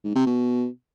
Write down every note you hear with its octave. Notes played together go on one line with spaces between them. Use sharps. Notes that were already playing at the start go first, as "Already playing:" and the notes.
G#2
C3
B2